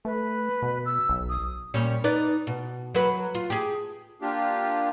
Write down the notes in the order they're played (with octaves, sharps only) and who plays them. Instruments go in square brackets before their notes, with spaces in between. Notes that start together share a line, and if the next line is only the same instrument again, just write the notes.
[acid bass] A3 [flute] B4
[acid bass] B2
[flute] E6
[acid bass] B1
[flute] D#6
[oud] A#2 G3 C#4
D#4 B4 D5
B2
F#3 B4
F4
G4 G#4
[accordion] A#3 D4 F4 G4